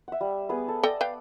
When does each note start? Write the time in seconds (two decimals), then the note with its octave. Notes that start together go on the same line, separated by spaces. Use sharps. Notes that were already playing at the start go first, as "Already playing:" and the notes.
0.08 E5 F#5
0.21 G3
0.49 B3 G#4 B4
0.68 A4
0.83 A4 D5 D#5 G5
1.01 B4 F5 G5